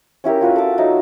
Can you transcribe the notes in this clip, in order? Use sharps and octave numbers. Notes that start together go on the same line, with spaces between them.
C#4 E4 G4 A#4
F4 F#4 B4 C#5
A4 D6
F#3 D#4 E5